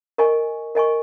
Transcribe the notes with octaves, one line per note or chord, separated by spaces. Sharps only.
A#4 D#5 G#5 C#6
A#4 D#5 G#5 C#6